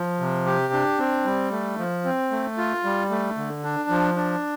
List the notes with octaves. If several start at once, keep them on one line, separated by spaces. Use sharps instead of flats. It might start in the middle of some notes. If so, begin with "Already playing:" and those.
Already playing: F3
C3
G4
D4
C4
G3
A3
F3
C4
A3
F4
G3
A3
D3
D4
F3
D4